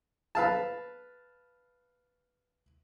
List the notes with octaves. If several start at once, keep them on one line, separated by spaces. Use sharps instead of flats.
B4 F5 A5